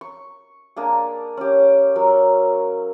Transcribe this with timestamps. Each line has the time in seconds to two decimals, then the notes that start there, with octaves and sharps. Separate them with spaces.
0.01 C#6
0.76 A#3 D4 G#4
1.37 C#4 G4
1.95 F#3 F#4 A#4 E6